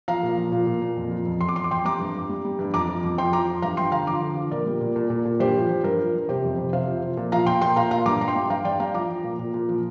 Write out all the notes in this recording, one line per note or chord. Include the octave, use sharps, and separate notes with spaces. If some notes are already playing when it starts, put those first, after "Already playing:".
F3 F5 A#5
A#2
F3
A#2
A#2
A#2
F2
F3
F2
F2 C6
D6
F2 C6
D6
F2 G5 C6
G3 A#5 D6
G2
G2
G3
G3
G2
F2 A#5 D6
F3
F2
F3 G5 C6
F3 A#5 D6
F3
G2 F5 A#5
G2 G5 C6
D3 F5 A#5
F3 A#5 D6
D3
F3
A#2 A#4 D5
G3
A#2
A#2
A#2
A#2
G2 G4 C5
F3
F3
G2 A#4
F3
G2
C3 G4 C5
F2
C3
C3 C5 F5
F3
F3
A#2
F3 F5 A#5
A#2 G5 C6
A#2 G5 C6
A#2 F5 A#5
A#2 F5 A#5
G2 A#5 D6
G2 A#5
G5 C6
G3
G2 F5 A#5
G2 D5 G5
G3 F5 A#5
F3 A#5 D6
F3
A#2
A#2
A#2
F3